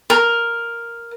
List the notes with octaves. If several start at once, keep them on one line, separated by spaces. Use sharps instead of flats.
A#4